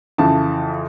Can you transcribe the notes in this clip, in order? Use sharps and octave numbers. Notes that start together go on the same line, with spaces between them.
F2 C#3 E3 A5